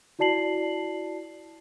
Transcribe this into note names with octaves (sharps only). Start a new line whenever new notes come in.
E4 F#4 D5 A5 C7 F#7